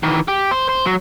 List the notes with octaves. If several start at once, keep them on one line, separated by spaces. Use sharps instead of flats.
D#3 E3
G4
C5
C5
F#3